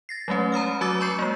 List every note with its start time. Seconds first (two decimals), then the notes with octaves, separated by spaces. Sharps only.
0.09 A6 A#6 C7
0.28 F#3 G#3 A3 C#4 B4
0.52 A#5 B5 D#6 F6
0.81 F#3 F#4 B4 D6 E6 A6
1.01 B5 C#6 G6 C7 C#7
1.19 G#3 A#3